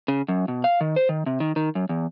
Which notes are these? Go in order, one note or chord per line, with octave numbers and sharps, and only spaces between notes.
C#3
F#2
B2
F5
D#3
C5
D#3
C3
D#3
D#3
F#2
E2